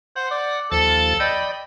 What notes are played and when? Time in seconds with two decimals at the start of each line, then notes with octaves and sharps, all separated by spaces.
0.16 C5 F#5
0.31 D5
0.72 D#2 F3 A4 A6
1.20 D5 D#5 G5 B5